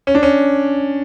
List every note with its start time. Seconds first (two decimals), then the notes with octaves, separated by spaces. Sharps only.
0.07 C#4
0.15 D4
0.23 C#4